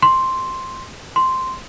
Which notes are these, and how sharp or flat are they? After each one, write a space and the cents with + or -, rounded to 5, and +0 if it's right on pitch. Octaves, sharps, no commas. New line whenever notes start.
C6 +5
C6 -5